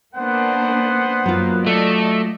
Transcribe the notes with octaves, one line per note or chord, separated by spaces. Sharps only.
A#3 B3 D4 C5 F#5
F#2 F#3 A#3 F4
A3 D5 D#5